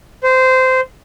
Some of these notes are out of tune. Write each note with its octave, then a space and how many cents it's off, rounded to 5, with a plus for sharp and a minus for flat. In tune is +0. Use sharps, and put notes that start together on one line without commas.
C5 -20